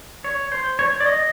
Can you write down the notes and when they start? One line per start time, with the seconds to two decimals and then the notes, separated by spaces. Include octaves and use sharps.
0.24 C#5
0.52 C5
0.79 C#5
1.00 D5
1.06 D#5